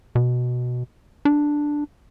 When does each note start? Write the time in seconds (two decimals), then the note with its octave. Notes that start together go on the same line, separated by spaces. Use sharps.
0.15 B2
1.25 D4